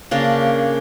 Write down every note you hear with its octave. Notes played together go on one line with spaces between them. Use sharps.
C#3 A#3 D4